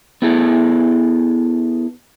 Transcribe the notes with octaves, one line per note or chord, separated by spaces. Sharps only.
B3 E4 G#4 A4